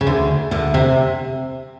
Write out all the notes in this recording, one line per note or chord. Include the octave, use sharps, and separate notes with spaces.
C#3
D2 D3
D2 D3
C3